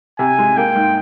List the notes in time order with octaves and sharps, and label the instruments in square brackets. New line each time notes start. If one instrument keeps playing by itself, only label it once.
[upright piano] C3 [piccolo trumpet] G#5
[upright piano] G#3
[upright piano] A#3 [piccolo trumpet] G5
[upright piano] G#2